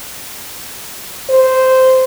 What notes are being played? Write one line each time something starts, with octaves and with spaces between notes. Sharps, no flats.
C5